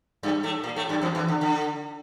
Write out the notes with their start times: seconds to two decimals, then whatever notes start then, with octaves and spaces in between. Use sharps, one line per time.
0.23 G2 G3
0.43 A2 A3
0.64 A#2 A#3
0.76 A2 A3
0.89 G2 G3
1.02 F2 F3
1.15 E2 E3
1.28 D3
1.41 D3